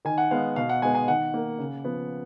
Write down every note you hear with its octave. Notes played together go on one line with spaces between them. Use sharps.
D#3 G#5
F#5
G#3 B3 F5
B2 F5
F#5
G#3 B3 G#5
G#5
D#3 F#5
A#3
C#3
F3 B3